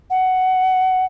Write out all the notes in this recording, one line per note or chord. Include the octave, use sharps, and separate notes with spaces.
F#5